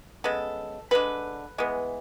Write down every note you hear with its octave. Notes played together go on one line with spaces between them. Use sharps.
C#3 G#3 B3 A4
D3 G#3 B3 B4
E3 G#3 B3